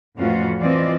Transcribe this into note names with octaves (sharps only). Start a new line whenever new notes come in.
F2 A2 E3 C#4 F4 F#4
E3 F3 C4 F4 D5 D#5